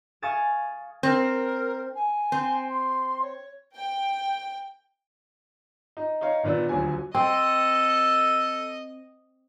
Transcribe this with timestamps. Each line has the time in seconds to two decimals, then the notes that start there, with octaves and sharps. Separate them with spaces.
0.22 F5 G#5 C#6 D#6 A6 E7
1.03 C4 A#4
1.94 G#5
2.32 C4
2.70 C6
3.22 C#5
3.75 G5
5.97 D#4
6.21 D#4 C#5 F5
6.43 A#2 D#3 B3 D4 E6
6.69 D#1 D2 D3 F#3 F#4 G#5
7.15 C4 A4 D#5